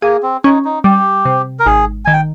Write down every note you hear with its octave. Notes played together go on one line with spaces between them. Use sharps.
A#3 G#4
C4
C#4 D#4
D#4
G3 G4
C3
A#4
G#1 G#4
D#3 G#5
G5